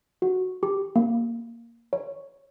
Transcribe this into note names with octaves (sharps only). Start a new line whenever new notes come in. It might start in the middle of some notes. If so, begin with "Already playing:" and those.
F#4
G4
A#3
C#5